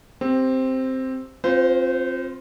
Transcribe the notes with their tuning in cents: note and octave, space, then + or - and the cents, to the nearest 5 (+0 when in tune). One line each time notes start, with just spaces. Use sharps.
C4 +0 G4 +0
C4 +25 F4 +15 C5 -30